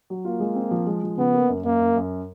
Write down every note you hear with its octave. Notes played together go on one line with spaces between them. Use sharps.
F#3
A#3 F4
G#3
C4
F3
G#3
F3
C#3 B3
A#3
F#2
F#2 A#3
F#2
F#2